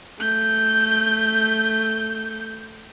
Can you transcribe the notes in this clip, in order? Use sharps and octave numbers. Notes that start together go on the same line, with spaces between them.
A3 G6